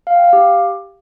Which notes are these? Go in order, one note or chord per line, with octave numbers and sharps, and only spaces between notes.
F5
G5
F5
G4